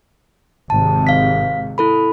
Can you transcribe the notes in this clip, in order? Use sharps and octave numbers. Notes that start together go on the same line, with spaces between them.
G#1 G#2 C3 A5
F5 B6
E4 A4 B5